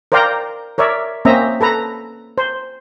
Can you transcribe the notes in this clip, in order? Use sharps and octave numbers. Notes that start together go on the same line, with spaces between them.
A#4 C5 D5 F5 G5 A#5
A#4 C#5 D5 E5
A#3 C4 C#4 D#5 E5 A#5
A4 B4 A#5
C5